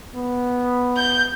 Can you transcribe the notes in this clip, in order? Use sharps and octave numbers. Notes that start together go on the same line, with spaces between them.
B3
G6